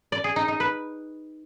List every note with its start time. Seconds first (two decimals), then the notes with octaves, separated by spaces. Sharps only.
0.12 D5
0.24 G#4
0.36 D#4
0.48 D#4
0.60 B4